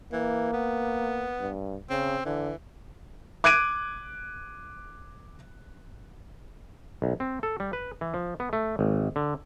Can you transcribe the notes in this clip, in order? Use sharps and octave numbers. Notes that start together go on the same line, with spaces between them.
E3 A#3
B3
G2
C#3 C4
D3 E3
D6 F#6 G#6 D7 D#7
B1
C4
A4
G3
B4
E3
F3
B3
A3
G#1
D3